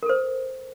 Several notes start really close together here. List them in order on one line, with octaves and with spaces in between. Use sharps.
A#4 A4 C5